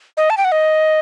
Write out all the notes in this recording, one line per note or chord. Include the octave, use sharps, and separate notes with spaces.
D#5
A5
G5
F#5
D#5